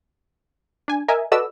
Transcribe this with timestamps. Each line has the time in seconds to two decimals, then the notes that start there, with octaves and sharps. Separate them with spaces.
0.88 D4 G#5
1.08 A#4 D#5 E5 G#5
1.32 F#4 A4 B4 D5 D#5 E6